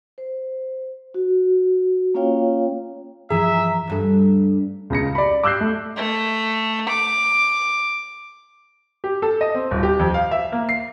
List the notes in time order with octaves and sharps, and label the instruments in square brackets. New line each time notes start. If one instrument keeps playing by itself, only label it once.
[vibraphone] C5
F#4
A#3 C#4 F4 C#5 F5 G5
[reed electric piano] G2 E3 F3 [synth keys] G#4 G#5 [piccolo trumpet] E5 [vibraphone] A#5
[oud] D2 G2 A4
[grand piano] C#2 C#3 A#6 C#7
D5 B5
D6 E6 F#6 G6 C7
A3
[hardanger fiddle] A3
D6
[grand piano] G4
A4
D#5
C4
D#1
G4
F2
F5
E5
A#3
C7